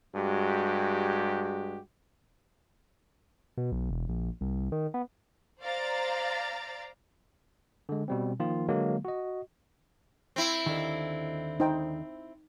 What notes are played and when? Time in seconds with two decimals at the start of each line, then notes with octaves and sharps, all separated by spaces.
0.15 G2 G#3 F#4 G4
3.57 B2
3.72 B1
3.91 E1
4.09 A#1
4.41 C2
4.72 D#3
4.94 B3
5.62 C5 D5 F5 A#5 A6
7.89 D3 G#3
8.08 B2 G3 C4
8.40 D#3 F3 A#3 F4
8.68 D3 F#3 G#3 A#3
9.05 F#4 D#5
10.36 C4 E4
10.66 D#2 D3 D#3
11.60 D#4 C5 G5